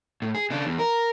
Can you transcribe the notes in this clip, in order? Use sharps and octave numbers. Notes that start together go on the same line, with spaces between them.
A2
G#4
C#3 D4
E2
A#4